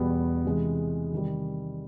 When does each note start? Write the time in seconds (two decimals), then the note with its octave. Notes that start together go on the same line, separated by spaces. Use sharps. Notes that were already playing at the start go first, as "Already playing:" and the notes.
Already playing: E2 B2 G3 B3
0.45 C3 E3 G#3
1.12 C3 D#3 G3